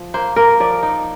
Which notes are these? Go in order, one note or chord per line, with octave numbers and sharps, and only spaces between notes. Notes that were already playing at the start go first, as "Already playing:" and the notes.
Already playing: F3
A#3 C5
A#3 A#4
F3 D5
D#4